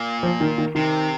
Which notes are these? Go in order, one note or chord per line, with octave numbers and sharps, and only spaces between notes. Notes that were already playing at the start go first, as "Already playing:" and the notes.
Already playing: A#2
F3
D#3
D#3
C3 D#3